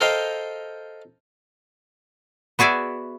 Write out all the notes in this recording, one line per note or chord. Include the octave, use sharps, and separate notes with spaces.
A4 A#4 C5 D#5 F5 G5
B3 F#4 G#4 D5 E5